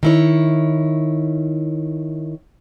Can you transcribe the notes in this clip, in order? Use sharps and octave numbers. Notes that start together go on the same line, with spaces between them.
D#3 E4 C#5